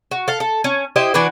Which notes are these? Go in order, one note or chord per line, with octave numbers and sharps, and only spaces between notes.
F#4
A4 F5
A4
C#4
E4 G4 C5 D#5
E3 D4 F#4 B4